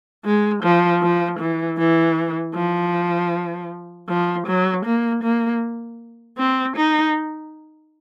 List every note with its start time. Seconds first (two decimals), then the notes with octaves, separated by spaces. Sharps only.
0.25 G#3
0.63 F3
1.02 F3
1.39 E3
1.78 E3
2.55 F3
4.09 F3
4.47 F#3
4.85 A#3
5.23 A#3
6.38 C4
6.77 D#4